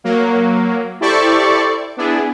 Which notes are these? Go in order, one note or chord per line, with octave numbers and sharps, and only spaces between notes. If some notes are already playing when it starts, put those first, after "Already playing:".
F#3 A#3
E4 G4 A4 C5 D5 C#6
B3 D4 E4 G#4